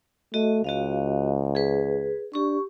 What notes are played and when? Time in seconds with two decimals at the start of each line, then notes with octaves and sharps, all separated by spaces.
0.34 A3 F#4 D#5
0.64 C#2 F#4 D#5 F5
1.55 G#4 B4
2.34 D4 G4 C#6